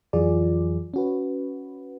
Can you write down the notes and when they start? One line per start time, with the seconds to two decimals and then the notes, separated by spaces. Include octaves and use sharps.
0.13 F2 E3 F#3 F4 G#4 D5
0.94 C#4 F#4 B4